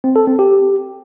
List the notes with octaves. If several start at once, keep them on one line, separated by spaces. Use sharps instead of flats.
C4
A4
C4
G4